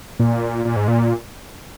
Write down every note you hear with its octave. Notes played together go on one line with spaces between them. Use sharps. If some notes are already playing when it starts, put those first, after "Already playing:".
A#2
A#2
G#2
A#2